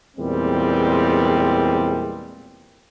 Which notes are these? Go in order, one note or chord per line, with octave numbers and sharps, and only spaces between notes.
E2 A#2 G3 G#3 C4